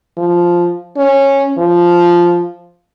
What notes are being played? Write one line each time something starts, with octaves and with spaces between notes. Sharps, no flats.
F3
C#4
F3